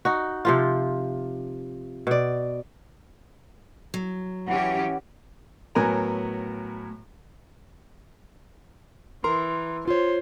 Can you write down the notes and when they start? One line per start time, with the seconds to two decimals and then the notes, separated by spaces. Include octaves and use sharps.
0.05 D#4 F#4
0.45 C3 F3 F4
2.07 B2 D5
3.94 F#3
4.47 E3 C#4 G4 F#5
5.75 A2 F#3 B3 A#4 G#5 A#5
9.24 E3 A#4 A#5 C6
9.88 F4 C5 C#5